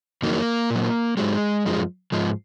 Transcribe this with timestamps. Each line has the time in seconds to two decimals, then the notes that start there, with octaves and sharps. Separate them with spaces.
0.22 F2 D#3 F#3 A#3
0.70 A#2 F#3
1.17 G#2 F#3 G#3
1.65 F#2 F3 G#3
2.12 G#2 F3 G#3